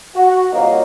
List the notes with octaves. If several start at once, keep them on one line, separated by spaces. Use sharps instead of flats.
F#4
C2 A#2 F#3 A#3 D#4